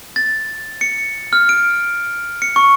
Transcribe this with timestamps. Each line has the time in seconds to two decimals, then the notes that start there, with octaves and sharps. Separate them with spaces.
0.16 A6
0.81 C#7
1.33 F6
1.49 D7
2.42 C#7
2.56 C#6